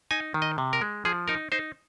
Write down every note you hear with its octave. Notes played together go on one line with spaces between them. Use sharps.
D#4 G#5
D#3
D#5
C3
A#4
G#3
F3 G#4
D#4 A#4
D#4 C5